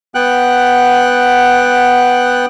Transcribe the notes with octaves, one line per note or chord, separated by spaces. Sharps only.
B3 F#5 G5 F#6